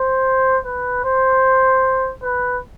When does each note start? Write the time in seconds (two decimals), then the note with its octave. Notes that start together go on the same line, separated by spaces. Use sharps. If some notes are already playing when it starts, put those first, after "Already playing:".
Already playing: C5
0.65 B4
1.05 C5
2.23 B4